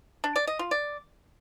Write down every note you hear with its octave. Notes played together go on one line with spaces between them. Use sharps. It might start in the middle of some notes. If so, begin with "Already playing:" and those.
D4
D5
D#5
F4
D5